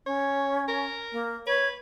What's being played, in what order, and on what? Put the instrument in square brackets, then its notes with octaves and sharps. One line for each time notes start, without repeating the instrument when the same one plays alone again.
[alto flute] C#4 [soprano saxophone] C#5
[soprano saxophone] A#4
[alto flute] A#3
[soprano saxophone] B4 [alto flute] C#5